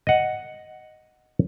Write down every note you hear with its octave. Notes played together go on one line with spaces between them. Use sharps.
D#5 F#5